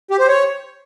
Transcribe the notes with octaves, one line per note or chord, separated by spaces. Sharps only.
G4
C5
C#5